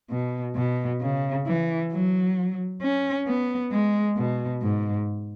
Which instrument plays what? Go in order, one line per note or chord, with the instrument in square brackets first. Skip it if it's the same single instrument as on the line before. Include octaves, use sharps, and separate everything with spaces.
[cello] B2
B2
C#3
E3
F#3
C#4
B3
G#3
B2
G#2